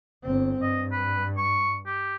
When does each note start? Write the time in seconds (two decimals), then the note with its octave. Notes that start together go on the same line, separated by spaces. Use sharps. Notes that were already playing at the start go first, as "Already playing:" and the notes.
0.23 G1 C4
0.62 G2 D#5
0.92 B4
1.37 C#6
1.86 G4